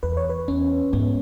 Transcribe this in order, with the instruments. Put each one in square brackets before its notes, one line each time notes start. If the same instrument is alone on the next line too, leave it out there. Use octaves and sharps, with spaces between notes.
[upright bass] E2 [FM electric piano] B4
[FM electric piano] C#5
B4
[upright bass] E2 [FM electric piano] C#4
[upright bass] G#2 [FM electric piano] B3